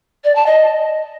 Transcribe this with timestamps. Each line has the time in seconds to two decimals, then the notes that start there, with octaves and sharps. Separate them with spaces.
0.24 D5
0.35 A5
0.46 D#5